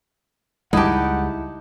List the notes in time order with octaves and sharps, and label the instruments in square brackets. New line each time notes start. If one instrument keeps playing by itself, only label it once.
[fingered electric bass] C#2 G3 G#3 [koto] D#4 G4 [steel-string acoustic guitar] E4 A5 [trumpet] F#5